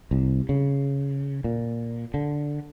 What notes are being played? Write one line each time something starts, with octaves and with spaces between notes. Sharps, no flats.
C2
C#3
A#2
D3